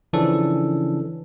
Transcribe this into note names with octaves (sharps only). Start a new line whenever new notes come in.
C#3 E3 F3 C#4 D4 A4